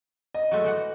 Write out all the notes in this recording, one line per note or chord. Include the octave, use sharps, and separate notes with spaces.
D#5
F#3 G#3 A3
E3 F#4 F#5